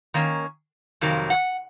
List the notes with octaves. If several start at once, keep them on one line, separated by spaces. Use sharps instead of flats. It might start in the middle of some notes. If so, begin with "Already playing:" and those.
D#3 A#3 C#4
F2 C3 D#3 F#3 A#3
F#5